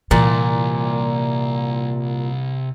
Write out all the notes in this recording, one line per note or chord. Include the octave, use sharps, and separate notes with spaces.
C2 A#2 E3